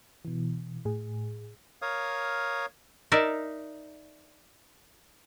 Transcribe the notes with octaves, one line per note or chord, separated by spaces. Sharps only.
B2 E3
A2 G#4
A#4 C#5 F5 D#6
D#4 A#4 D5 E5